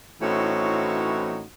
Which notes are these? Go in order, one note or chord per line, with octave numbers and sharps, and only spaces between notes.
A2 E3 C4 C#4 D#4 F#4